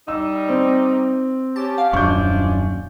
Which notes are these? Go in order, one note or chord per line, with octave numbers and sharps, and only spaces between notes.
G3 D#4 E6
C4
C#4 G4 A5
F5
D#1 F#2 F3 G#3 D4 C#6 G6